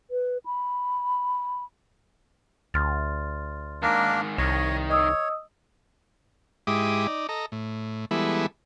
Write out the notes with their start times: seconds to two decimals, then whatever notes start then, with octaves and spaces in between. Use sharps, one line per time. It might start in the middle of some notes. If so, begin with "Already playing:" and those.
0.11 B4
0.45 B5
2.74 D2 C6 F6 A6
3.82 G#2 D#3 A#3 D4 A#4
4.38 C2 D#3 C#5 D#5
4.89 C#5 D#5 D#6 E6
6.67 G#2 G#3 E4 G4 D6 D#6
7.07 D#4 D5
7.29 A4 D#5 A#5
7.52 A2
8.11 E3 G3 G#3 B3 E4 A4